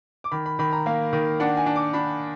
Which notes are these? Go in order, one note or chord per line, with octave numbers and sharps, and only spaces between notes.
D6
D#3 B5
B5
D#3 B5
A#5
A#3 F5
D#3
D4 F#5
G#5
D4
D6
D4 B5